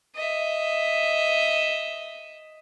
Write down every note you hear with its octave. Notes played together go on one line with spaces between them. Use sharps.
D#5 E5